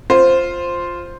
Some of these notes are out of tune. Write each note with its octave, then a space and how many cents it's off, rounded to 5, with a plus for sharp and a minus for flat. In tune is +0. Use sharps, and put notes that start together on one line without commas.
F4 +0 C5 +0